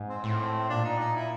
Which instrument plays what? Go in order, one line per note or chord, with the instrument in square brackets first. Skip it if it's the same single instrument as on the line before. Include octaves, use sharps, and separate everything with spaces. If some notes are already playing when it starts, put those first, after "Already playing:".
Already playing: [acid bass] G#2
[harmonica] C4
[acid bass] A2 [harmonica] C4
[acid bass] A#2 [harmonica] D4
[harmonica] D#4
D#4
E4